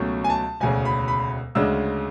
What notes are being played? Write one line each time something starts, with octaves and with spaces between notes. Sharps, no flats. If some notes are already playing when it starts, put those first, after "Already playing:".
Already playing: C#2 B2 F#3 A3 C#4
G#5
A5
E1 D2 C#3 G#5
B5
B5
D2 C#3 G#3 D4 E6